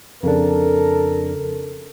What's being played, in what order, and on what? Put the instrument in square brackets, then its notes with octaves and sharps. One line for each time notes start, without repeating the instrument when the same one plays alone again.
[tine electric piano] F2 C#3 D4 [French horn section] A4 A#4